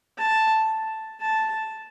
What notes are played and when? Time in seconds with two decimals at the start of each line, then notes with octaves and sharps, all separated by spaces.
0.18 A5
1.21 A5